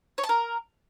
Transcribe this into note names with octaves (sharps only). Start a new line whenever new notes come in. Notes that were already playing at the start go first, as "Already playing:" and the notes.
C#5
A5
A#4